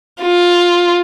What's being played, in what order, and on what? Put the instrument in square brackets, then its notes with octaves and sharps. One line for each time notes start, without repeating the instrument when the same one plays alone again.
[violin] F4